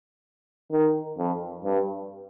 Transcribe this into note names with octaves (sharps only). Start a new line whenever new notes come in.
D#3
F2
G2